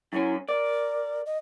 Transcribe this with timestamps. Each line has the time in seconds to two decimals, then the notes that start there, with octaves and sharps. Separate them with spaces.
0.13 F#2 C#4 E4
0.49 A#4 D5
1.26 D#5